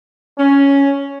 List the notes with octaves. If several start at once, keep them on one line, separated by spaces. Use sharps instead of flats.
C#4